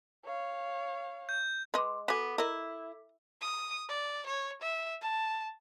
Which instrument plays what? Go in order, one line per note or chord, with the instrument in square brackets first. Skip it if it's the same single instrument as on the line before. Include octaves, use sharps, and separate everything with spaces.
[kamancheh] C#5 F5
[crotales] G6
[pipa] G#3 [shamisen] B4 D#5 [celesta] C6 D6
[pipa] B3 [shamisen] F#4 G#5 [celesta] A4 D6 B6
[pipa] E4 [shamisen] A#4 D#5
[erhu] D#6
D5
C#5
E5
A5